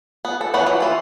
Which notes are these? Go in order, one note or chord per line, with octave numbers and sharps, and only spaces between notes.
B3
A4
E3 B3 C#5 F#5
F#3
E3 F4